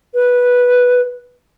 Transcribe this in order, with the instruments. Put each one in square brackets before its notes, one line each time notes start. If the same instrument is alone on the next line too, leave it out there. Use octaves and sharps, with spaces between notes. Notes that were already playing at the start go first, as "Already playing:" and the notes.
[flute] B4